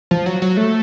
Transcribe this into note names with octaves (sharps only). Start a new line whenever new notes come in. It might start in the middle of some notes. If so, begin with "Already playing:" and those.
F3
F#3
F#3
A3